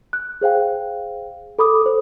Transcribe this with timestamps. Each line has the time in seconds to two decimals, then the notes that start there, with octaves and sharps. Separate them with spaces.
0.13 F#6
0.41 G#4 C5 F5 G5
1.59 A4 B5 D6 D#6
1.82 A4 C5